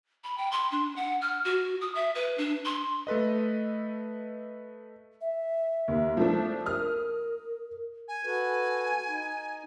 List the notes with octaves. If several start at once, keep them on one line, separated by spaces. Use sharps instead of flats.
B5
G5
C6
D4
F#5
F6
F#4
D#6
E5
B4
D4
C6
A3 A4 B4 D#5
E5
D#2
F3 A3 D4
A#4 D#6 F6
G#5
F#4 A4 B4
D#4